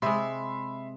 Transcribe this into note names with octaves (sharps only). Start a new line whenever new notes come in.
C3 G#3 E5 B5 C6